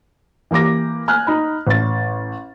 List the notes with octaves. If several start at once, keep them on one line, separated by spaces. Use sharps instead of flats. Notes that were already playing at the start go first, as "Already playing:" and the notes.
E3 A#3 G4 D6 A#6
G#5 F6 F#6
D#4 B5
A1 A6